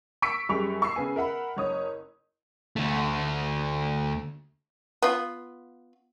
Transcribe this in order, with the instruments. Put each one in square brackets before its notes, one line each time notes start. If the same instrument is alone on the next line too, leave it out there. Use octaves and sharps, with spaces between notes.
[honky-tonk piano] C#6 E6 B6 C#7 D7
F#2 G3 G#4 C#6 F7
C#6 E6 C7
C#3 B3 G#5
A#4 E5 F#5 B5
F#1 C#5 D#6
[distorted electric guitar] D2 A3
[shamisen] B3 F4